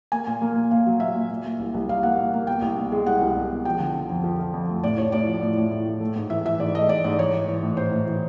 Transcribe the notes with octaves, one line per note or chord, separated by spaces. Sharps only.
A#3 G#5
A#2
A#3
A#2
A#2 F5
F#3
A#2 E5
A#2
A#2
A#2
C2
C2
C2 F5
A#3 F#5
A#2
A#3
B2 G5
C2
B2
G#3
C2 F#5
C2
C2
B2
F3 G5
D3
D3
F2
F3
F3
F2
A3
A2 D5
A2 C#5
A2 D5
F3
A2
A2
A2
A2
A3
G#2
E3 E5
E3 E5
G#2 D5
A3 D#5
G#2 D5
G#2 D5
E3 C#5
E3
E3
A2
A2 C5
A2
E3